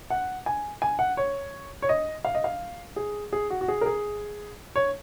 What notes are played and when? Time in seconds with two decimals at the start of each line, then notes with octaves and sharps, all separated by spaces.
0.10 F#5
0.46 G#5
0.82 G#5
0.99 F#5
1.17 C#5
1.82 C#5
1.89 D#5
2.25 F5
2.35 D#5
2.44 F5
2.96 G#4
3.33 G#4
3.50 F#4
3.61 F#4
3.68 G#4
3.81 A#4
3.86 G#4
4.76 C#5